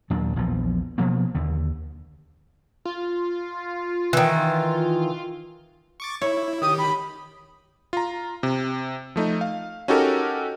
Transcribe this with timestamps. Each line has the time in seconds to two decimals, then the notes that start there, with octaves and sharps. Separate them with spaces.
0.10 D#2 A#2 F#3 D4
0.36 A#1 E2 A#2 F3
0.98 B2 F3 A#3 B3
1.35 D#2 D3
2.85 F4
4.13 D#3 E3
6.00 C#6 D6 A6
6.21 E4 C#5
6.62 D#3 G4 D#6
6.78 B5
7.93 F4 A#5
8.43 C3
9.16 F3 A3 D#4
9.41 F5
9.88 C#4 D#4 F#4 G4 A4 A#4